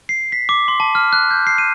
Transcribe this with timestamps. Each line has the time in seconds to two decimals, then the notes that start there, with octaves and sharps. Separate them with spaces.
0.09 C7
0.32 B6
0.49 D6
0.68 C6
0.80 A5
0.95 F6
1.13 F#6
1.31 G6
1.47 C7
1.58 D#7